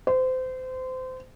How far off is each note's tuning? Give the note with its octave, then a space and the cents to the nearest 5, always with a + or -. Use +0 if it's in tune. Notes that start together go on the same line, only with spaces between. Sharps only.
C5 -25